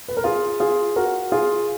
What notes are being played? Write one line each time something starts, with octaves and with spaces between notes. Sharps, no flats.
B4
A#4
F4 G#4
F4 G#4
F#4 A#4
F4 G#4